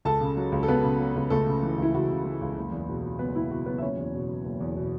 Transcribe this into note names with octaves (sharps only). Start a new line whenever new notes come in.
C#2 A4 A5
C#3
F#3
C#2
A4
C#2 B3 B4
C#3
F#3
C#2
C#2 A3 A4
C#3
E3
C#2 E4
C#2 F#4
C#3
E3
C#2
F#1
E2
B2
F#3
F#1 B3 B4
E2 E4
B2 F#4
F#3 B3 B4
E5
F#1 C#4 C#5
E2
B2
F#3
F#1
E2
B2